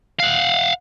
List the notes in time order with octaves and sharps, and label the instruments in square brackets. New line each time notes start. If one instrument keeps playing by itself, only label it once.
[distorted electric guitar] F5 F#5